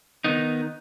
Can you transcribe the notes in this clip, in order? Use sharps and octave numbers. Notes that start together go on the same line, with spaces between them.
D#3 B3 D#4